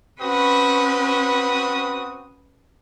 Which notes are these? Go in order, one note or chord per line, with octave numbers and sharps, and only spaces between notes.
C4 C#4 F#4 B4 D#6